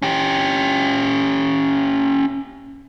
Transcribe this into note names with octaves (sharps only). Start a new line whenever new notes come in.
C#4 G4